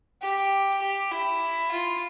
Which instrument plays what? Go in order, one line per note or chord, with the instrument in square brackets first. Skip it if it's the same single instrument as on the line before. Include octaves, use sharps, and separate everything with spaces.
[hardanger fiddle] G4
G4
E4
F4